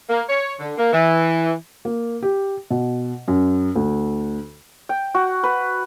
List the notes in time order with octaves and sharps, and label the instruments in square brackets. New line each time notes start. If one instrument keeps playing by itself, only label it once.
[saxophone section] A#3
C#5
D3
A#3
E3
[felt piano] A#3
G4
B2
F#2
D2
[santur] G5
F#4
B4